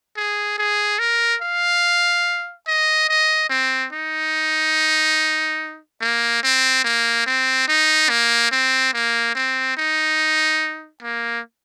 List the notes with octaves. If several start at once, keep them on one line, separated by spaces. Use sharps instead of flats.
G#4
G#4
A#4
F5
D#5
D#5
C4
D#4
A#3
C4
A#3
C4
D#4
A#3
C4
A#3
C4
D#4
A#3